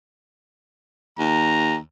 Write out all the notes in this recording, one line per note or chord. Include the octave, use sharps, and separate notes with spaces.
D#2 A#5